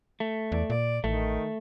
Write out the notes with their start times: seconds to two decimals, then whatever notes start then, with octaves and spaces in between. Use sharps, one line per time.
0.20 A3
0.52 E2 D5
0.70 A#2 D5
1.04 A1 D#3 A3